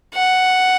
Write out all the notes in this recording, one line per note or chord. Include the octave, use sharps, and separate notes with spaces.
F#5